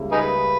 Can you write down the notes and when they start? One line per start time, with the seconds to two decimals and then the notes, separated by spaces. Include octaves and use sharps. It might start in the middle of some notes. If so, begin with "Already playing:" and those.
Already playing: C#2 C#3 G3 A#3 E4
0.12 D#4 G#4 B4